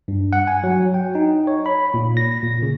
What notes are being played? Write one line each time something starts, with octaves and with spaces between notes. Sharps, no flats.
G2
F#5
G#5
F#3
G5
D#4
C#5
B5
A#2
A#6
A#2
C#3